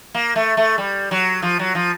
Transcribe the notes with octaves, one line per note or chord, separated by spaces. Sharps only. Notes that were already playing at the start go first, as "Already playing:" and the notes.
A#3
A3
A3
G3
F#3
F3
F#3
F3